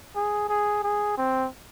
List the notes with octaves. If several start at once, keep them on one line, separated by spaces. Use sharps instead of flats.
G#4
G#4
G#4
C4